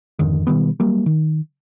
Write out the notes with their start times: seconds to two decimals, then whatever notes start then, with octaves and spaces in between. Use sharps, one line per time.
0.19 G#1 F2 D3 D#3
0.47 B2 D#3 G3 B3
0.80 F#3 G3 A#3
1.06 D#3